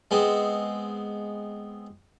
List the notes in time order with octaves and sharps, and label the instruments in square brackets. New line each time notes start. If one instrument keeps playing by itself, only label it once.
[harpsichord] G#3 B3 C4